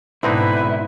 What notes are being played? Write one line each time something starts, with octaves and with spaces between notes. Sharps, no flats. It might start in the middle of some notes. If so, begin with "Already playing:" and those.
G#2 B2 D3 C4 D#4 E4 B4